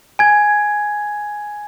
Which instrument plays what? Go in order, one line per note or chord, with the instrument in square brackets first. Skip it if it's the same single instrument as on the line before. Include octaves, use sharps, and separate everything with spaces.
[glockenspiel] G#5 G#6